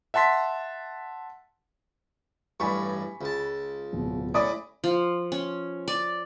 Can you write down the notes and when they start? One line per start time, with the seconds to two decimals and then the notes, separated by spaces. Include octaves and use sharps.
0.14 E5 F#5 A5 C6 B6
2.60 A1 G2 G3 G#5 B5 C#6
3.21 C#2 A5
3.93 D1 B2
4.34 A2 C#4 D5 B5 D#6
4.84 F3
5.32 C#4
5.88 D5